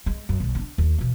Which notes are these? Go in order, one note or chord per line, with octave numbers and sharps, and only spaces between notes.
G#3
F#2
B1 G#3
C4 D4
D#2
B2 E3